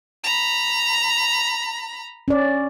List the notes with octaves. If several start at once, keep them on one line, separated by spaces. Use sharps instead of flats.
A#5 B5
C#4 D5